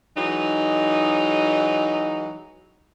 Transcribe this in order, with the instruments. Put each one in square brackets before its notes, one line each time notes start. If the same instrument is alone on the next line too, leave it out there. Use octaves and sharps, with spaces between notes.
[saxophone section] E3 F#3 G#3 D#4